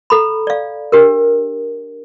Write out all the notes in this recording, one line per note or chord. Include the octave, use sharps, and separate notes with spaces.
A4 A#5 B5
D5 F5
D4 G4 A#4